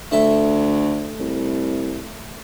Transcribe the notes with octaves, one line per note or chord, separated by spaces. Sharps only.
D2 A3 A4 E5
C2